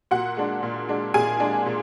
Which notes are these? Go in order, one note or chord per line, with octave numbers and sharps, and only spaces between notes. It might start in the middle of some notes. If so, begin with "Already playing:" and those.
A#2 F#4 F#5
G#3 D4
A#2
G#3 D4
A#2 G#4 G#5
G#3 D4
A#2